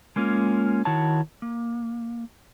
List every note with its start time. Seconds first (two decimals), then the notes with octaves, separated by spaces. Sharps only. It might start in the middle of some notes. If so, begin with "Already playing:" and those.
0.16 G#3 A#3 C#4 F4
0.85 D#3 E4 F#4 C#5 A5
1.42 A#3